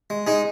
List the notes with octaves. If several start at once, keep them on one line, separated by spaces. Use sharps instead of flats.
G#3
G#3 D#4 G#4